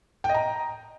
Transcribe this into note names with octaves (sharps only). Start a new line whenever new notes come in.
G5
D#5
A#5